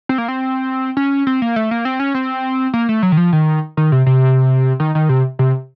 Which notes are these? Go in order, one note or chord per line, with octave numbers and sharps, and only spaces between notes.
C4
A#3
C4
C#4
C4
A#3
A3
A#3
C4
C#4
C4
A#3
A3
F#3
D#3
F3
D#3
D#3
C3
C3
D#3
D#3
C3
C3